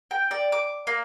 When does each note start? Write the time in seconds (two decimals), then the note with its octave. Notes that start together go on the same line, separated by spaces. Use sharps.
0.11 G5
0.31 D5
0.52 D6
0.87 A#3